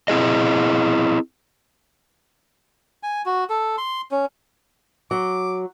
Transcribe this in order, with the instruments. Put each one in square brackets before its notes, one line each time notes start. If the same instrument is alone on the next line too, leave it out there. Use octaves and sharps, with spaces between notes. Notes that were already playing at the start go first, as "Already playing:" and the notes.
[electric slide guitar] C4 E4 G#4 D#5
[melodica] G#5
F#4
A4
C6
C#4
[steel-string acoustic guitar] F#3 [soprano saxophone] D6